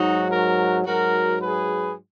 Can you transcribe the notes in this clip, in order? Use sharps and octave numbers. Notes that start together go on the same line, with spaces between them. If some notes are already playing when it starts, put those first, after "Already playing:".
Already playing: G#2 F#3 D#4 F#4
F#4 A#4
G#2 F#3 F#4 A#4
G#4 B4